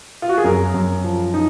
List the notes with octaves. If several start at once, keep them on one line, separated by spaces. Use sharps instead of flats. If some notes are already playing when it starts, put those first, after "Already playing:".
F4
F#4
G#4
F#2 A#4
F#2
F3
D#4